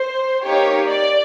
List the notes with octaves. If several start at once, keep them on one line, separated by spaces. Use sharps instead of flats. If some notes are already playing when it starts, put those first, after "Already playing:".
Already playing: C5
A#3 D#4 G4 C#5
D5